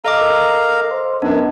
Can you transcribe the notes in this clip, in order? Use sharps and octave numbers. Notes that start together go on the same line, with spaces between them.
A4 D#5 F5 A#5 D6
A#4
C5
F#2 B3 D4 D#4